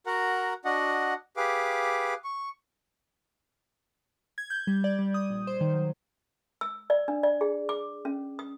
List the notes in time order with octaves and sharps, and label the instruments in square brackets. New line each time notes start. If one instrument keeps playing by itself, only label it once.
[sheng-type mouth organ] F#4 A#4 F#5 A#5
D4 F#4 D#5 F#5
G4 G#4 B4 F5 D6
C#6
[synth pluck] G#6
G6
G3
D5
G3
D#6
A#1
C5
D#3
F#3
[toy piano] E6
D5
D4
D5
G#4
D6
C#4
D#6